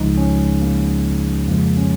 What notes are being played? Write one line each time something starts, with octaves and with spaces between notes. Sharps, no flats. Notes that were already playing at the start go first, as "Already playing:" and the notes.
Already playing: C#2 C#3 F3 G#3 D#4
C#4
A#3
F2 C#3 F3 G#3 A#3
C#4